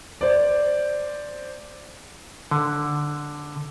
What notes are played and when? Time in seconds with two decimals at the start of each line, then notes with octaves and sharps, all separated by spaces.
0.21 C5 D5
2.51 D3